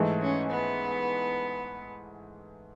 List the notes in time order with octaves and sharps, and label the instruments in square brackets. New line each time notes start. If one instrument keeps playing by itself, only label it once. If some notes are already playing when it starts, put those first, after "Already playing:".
Already playing: [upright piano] G#2 E3 A3
[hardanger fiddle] C#4
B3